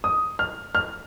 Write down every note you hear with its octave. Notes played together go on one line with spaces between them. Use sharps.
D#6
F6
F6